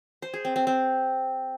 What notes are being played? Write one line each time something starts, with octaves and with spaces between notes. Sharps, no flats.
C5
G#4
C4
C4
C4